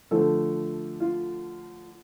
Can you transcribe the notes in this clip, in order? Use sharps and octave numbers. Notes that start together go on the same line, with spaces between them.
D3 F3 A3 A4
F4